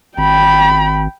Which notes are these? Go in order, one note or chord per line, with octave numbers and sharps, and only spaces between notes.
G#1 G5 B5